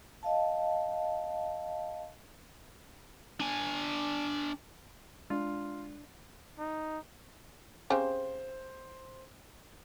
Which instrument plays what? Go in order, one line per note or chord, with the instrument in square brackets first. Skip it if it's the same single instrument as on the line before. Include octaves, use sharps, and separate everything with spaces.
[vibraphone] D#5 F5 A5
[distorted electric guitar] D4 G#5
[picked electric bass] G#3 [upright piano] D4 [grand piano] F4
[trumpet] D#4
[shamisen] C#3 C4 G4 [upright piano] C5